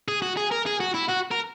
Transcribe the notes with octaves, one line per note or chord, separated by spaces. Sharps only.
G#4
F#4
G#4
A#4
G#4
F#4
E4
F#4
A#4